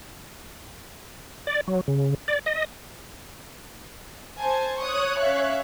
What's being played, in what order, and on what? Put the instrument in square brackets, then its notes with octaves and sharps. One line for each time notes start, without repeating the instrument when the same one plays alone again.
[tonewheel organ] D5
F#3
C#3
D5
D#5
[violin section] C5 G#5 A5
[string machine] C#5 F#6 [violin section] C#6 D#6
[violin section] C#4 E5 F5